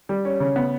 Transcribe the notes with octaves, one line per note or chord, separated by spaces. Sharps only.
G3
C#4
C#3
B3